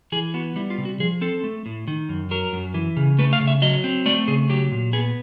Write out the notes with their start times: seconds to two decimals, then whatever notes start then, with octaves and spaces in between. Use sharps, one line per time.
0.12 E3 G#4
0.34 B3 F#4
0.56 G3 E4
0.70 F4
0.78 C3
0.85 F#4
1.00 F3 G#4
1.21 C4 A4
1.44 A3
1.66 A2
1.88 D#3
2.09 F#2
2.31 F#3 A#4
2.53 F#2
2.74 E3
2.97 C#3
3.19 A3 B4
3.33 F5
3.40 C#3
3.47 E5
3.62 F#3 D#5
3.84 C4
4.06 A3 D5
4.28 C#3 G#4
4.50 F#3 G4
4.72 A#2
4.93 B3 G#4